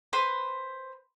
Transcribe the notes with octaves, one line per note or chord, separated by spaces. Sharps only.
B4 C5 C6